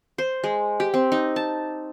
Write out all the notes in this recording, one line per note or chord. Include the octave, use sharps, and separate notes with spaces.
C5
G#3
G4
C4
D#4
A5